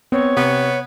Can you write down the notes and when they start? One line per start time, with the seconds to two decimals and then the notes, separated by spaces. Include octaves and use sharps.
0.12 B3 C4 C#5
0.37 C3 B3